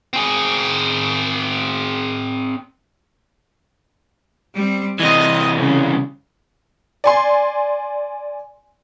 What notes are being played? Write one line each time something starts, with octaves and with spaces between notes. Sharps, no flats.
C4 G#4
G3 C4
C3 E3 D#5
C#3 G3
D5 G#5 C6